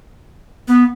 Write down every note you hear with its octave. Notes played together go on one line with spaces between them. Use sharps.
B3